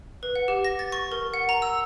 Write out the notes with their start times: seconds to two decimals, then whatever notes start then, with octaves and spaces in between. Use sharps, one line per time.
0.23 B4
0.36 F#5
0.48 G4
0.65 A#6
0.79 A6
0.92 C#6
1.12 A#4
1.34 F#5
1.49 A#5
1.62 E6